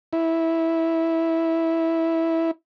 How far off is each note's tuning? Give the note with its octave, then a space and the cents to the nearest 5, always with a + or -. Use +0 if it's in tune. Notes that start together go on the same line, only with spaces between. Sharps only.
E4 -10